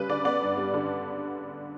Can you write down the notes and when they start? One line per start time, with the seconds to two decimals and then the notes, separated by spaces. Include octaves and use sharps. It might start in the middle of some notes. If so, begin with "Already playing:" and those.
Already playing: C#3 G3 B4
0.09 D3 D5
0.25 B3 D5
0.42 G2
0.57 G3
0.74 D3